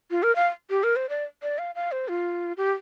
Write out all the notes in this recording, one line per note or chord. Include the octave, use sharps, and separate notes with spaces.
F4
A#4
F5
G4
A#4
C5
D5
D5
F5
F5
C5
F4
G4